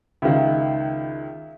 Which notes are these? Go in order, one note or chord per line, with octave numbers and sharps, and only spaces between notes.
C#2 D#3 E5 F5